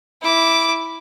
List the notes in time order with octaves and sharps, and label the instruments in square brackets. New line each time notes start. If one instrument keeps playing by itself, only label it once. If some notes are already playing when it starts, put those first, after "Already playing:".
[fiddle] E4 D6